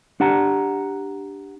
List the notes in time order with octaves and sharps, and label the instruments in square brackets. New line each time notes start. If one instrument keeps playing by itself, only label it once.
[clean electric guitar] D4 G4 F#5 A5 A#5